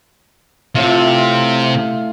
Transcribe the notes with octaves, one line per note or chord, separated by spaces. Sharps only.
A2 C3 F4